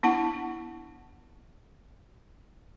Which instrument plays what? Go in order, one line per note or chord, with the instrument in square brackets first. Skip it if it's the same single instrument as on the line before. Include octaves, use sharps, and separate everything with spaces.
[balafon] B3 D4 E4 F#5 A5